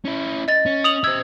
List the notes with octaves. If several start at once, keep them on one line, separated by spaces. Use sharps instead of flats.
C#4 E4
D#5 A6
C#4
D#6 F7 F#7
C5 E5 E6 G#6